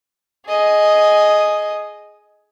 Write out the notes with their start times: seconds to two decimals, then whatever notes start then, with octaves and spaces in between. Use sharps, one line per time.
0.47 G#4 D#5